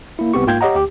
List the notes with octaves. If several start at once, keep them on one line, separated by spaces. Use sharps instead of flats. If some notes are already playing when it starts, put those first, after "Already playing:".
A#3 E4
C2 B3 C4 G4 C#6
G#2 A#3 F4 G5 G6 G#6
G4 C#5 D#5 F#5 A#5
D2 G4